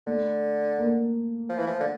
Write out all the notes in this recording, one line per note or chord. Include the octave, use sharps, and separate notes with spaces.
D3 A3
A#3
F3
E3
F3
D3